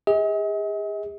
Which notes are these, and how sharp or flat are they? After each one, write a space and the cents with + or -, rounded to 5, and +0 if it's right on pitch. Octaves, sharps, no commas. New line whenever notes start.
G#4 -40 D#5 +40